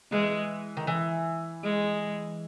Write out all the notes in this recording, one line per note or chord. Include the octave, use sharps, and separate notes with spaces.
E3 G#3
D#3
E3
G#3